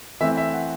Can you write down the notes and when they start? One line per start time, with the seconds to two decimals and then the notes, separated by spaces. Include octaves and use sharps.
0.21 E3 A3 C4 E5
0.37 E5
0.53 F#5